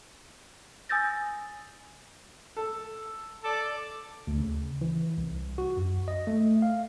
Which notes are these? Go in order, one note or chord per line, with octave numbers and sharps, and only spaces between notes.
G#5 D#6 E6 G6 A6 A#6
A4
A4 D5 D6
D2
C#3
E3
C2
F#4
F#2
D#5
A3
F5